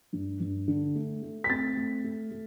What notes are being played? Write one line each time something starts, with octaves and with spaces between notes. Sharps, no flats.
G2
G2
D3
A3
A3
B6
C4 A6
A3
A3
A3